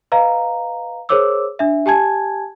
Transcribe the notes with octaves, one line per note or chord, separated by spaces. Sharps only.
B4 D#5 F5 A#5
G#4 A#4 C5 C#5 D6 E6
D4 E5
G4 G#5 A5 G#6